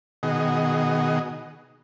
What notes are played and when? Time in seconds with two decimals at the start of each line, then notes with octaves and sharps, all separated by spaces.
0.23 B2 D#3 F#4 G#4 D#5